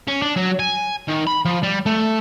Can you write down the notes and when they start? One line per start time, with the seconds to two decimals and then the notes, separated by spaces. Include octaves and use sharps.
0.08 C#4
0.22 D4
0.36 F#3
0.59 G#5
1.08 D#3
1.27 B5
1.45 F3
1.63 G3
1.86 A3